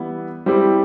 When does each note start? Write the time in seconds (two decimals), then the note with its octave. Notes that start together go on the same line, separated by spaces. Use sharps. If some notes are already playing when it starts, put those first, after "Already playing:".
Already playing: E3 G3 B3 E4
0.46 G3 C4 E4 G4